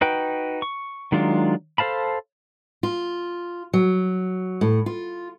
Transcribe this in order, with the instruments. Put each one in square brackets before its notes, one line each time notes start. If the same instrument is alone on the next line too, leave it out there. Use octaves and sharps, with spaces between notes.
[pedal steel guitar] D#4 F#4 B4 G5
C#6
D#3 F#3 G#3 D4 F4
A4 C5 F5 A5 B5
[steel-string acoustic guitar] F4
F#3
A2
F4